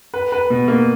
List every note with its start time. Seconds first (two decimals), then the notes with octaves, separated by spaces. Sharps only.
0.14 B4
0.32 B4
0.50 B2
0.68 A#3